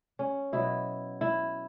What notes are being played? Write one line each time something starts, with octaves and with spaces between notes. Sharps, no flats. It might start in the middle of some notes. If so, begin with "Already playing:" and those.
C#4
B2 F#3 E4
E4